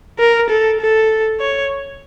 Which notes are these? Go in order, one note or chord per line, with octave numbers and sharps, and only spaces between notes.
A#4
A4
A4
C#5